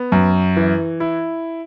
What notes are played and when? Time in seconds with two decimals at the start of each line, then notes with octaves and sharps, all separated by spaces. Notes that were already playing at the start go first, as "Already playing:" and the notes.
Already playing: B3
0.12 F#2
0.56 E3
1.00 E4